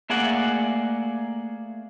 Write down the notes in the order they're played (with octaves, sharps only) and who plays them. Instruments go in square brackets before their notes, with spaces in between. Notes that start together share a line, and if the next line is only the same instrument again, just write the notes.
[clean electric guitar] A3 A#3 G#4 D5 F#5